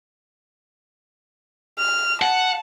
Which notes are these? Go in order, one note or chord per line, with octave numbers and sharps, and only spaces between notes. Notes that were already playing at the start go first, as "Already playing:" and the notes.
F6
F#5 A5